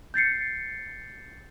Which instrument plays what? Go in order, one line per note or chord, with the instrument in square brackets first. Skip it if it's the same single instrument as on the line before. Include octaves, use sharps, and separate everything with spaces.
[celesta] G6 A6 C7 C#7